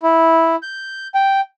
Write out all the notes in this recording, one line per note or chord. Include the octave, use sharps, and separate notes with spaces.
E4
G6
G5